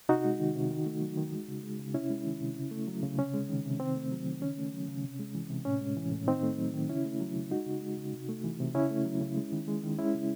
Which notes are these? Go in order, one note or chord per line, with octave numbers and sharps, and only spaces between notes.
C3 D#4 F#4
G#3
D#3
C3
D#3
A3
F#3
D#3
G#3
C#3
G#3
C#3
C3 C#4 E4
G#3
D#3
C3
C#3
A3
F#3
C#3
C3 C#4
G#3
D#3
C3
D#3 C4
A3
F#3
D#3
C#3 C#4
A3
F#3
C#3
C3
G#3
E3
C3
A2 C#4
G#3
E3
A2
D#3 C4 D#4
A3
F#3
D#3
C#3 C#4 E4
A3
F#3
C#3
G#3 D#4 F#4
C#3
G#3
C#3
C3
A3
E3
C3
C#3 C#4 E4
A3
F#3
C#3
G#3
D#3
G#3
D#3
G#3 C#4 E4
C#3